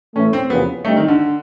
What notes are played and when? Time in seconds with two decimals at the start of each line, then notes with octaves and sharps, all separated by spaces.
0.16 A2 E3 A3 C#4
0.33 C4
0.50 E2 C3 F3 A#3 B3 C#4
0.85 D3 G3 A3 C4 D#4
0.97 D#3
1.08 D3